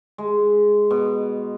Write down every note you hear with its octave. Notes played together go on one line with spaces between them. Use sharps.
G#3
B2